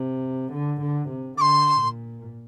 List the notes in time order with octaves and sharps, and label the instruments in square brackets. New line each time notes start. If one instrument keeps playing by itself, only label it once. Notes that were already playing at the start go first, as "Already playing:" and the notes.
Already playing: [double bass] C3
D3
D3
C3
[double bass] D3 [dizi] C6 D6
[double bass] A#2